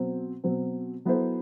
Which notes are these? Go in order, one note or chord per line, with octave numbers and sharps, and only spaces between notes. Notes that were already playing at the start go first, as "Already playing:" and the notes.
Already playing: B2 F#3 C4
B2 F#3 C4
F#3 B3 E4 A4 C5